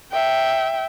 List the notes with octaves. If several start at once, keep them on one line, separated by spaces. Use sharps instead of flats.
E5 G5